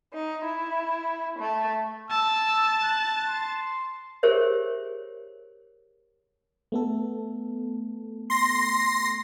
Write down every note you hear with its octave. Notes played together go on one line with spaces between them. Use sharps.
D#4
E4
A3
A5 E6
F#6
C6
G4 G#4 A#4 C5 C#5 E5
A3 B3 A4
C6 A#6